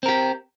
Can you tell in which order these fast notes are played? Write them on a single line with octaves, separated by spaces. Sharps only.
C4 A#4 G4